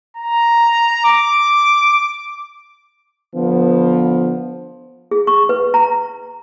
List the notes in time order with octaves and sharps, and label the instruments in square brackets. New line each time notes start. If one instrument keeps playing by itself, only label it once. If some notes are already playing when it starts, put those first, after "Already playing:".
[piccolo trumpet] A#5
D6
[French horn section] D3 F3 B3
[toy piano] G#4
C#6
B4
A#5